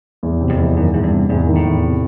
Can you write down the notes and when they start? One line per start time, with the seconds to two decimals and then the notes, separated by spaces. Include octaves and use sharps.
0.23 E2
0.41 C3
0.50 F2
0.58 E2
0.77 F#2 D#3
0.94 E2 G#2
1.03 G2
1.12 C3
1.29 E2 G#2
1.47 D#3
1.56 A2
1.65 E2
1.83 C3